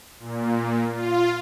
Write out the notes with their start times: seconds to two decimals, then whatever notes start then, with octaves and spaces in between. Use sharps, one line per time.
0.20 A#2
0.91 F4